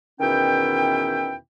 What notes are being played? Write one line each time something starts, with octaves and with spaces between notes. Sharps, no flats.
E2 B2 D#3 C#4 E4 G5